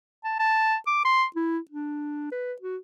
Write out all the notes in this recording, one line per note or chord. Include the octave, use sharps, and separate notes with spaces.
A5
A5
D6
C6
E4
D4
B4
F#4